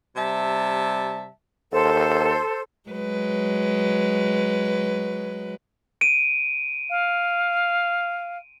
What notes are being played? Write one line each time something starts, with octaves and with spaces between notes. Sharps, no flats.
C3 G3 E5 A5
D#2 A4 C5
F#3 G#3 B4
D7 D#7
F5